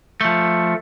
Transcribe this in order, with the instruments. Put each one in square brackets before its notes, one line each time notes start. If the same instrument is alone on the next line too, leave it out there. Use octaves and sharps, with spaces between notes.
[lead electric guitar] F3 A3